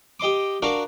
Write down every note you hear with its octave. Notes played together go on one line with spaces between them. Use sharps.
G4 D#5 C6 D6
D4 F#4 A#4 F5 D6